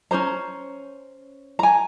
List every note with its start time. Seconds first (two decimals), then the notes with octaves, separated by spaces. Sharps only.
0.11 C#4 G#4 C5 A#5
1.59 G#5 A#5